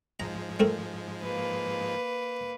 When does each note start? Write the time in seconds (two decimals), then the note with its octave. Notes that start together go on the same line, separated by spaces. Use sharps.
0.20 G#2 F3 G#3 A#5
0.60 A3 C4 A#4
1.22 A#3 B4